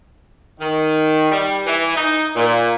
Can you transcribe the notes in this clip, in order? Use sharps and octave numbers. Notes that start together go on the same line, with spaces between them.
D#3
G3
E3
D#4
A#2